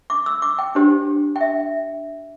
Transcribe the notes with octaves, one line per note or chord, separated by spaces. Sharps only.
D6
E6
D6
G5
D4 G4 C5
G5
E5